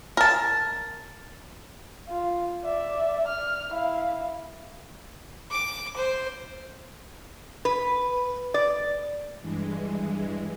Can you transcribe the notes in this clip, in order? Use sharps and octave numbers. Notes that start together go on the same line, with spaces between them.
A#4 A5
F4
D5 E5
F6
E4 F5
D6
C5
B4
D5
G2 E3 G#3